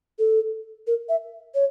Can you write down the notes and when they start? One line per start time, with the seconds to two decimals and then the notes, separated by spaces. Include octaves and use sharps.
0.19 A4
0.87 A#4
1.09 E5
1.55 C#5